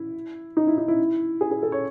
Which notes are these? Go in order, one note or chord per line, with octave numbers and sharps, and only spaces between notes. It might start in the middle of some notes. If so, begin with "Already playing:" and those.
Already playing: E4
D#4
E4
D#4
E4
G#4
G#4
A4
C#5